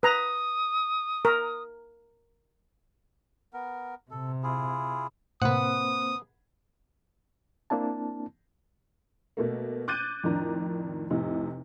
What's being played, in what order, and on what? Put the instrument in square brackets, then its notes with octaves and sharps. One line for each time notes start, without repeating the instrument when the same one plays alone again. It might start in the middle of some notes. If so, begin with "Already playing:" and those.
[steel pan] B4 A#5 [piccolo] D#6
[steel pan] A#4
[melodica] B3 A#4
[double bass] C3 [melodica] A4
[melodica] E4 F4 G#4
[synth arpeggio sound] A2 C3 [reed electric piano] A#3 C4 C5 [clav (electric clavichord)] B4 F#5 [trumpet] D#6
[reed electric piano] A#3 C4 D4 E4 A5
[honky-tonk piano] B2 A3 A#3
D6 F#6 G6 A6 D#7
F2 A2 D#3 D4 A#5
F1 A2 C3 D#4